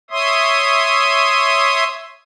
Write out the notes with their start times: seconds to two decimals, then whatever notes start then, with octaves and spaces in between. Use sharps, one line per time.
0.10 C#5 E5 C6 D#6